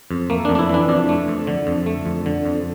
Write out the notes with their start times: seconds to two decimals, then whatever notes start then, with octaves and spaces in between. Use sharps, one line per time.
0.11 F2
0.30 A3 A#3
0.45 D4
0.49 F2
0.55 D4
0.59 E4
0.69 E3 D4
0.89 F2 D4
1.09 A3
1.28 F2
1.47 D3
1.67 F2
1.86 A3
2.06 F2
2.26 D3
2.45 F2